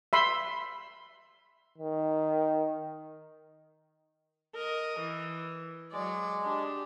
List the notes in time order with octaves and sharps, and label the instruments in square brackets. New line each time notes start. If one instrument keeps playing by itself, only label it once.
[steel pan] E5 B5 C6
[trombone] D#3
[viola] A#4 D#5
E3
[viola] F#3 D5 [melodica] G#3
[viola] D4 G4